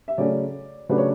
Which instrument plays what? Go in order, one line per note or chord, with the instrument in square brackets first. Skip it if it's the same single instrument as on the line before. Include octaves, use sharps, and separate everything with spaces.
[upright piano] E5
C#3 F#3 A3 C#4 D5
C#3 F#3 A3 D4 B4
C#5